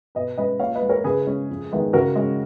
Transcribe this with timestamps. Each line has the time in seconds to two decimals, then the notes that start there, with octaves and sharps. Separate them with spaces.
0.15 B2 B4 D#5
0.38 G#3 C#4 B4 D#5
0.60 A#2 C#5 F5
0.75 B4 D#5
0.82 G#3 B3
0.89 A#4 C#5
1.04 C#3 G#4 B4
1.27 G#3 C#4
1.50 F2
1.72 D#3 G#3 B3
1.93 C#3 F#4 A#4
2.16 G#3 C#4